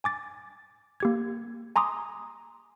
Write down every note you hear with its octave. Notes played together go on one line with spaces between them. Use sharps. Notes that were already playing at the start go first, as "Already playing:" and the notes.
G#5 D6 A6
A#3 G4 G#6
G#5 A#5 C6 D6 D#6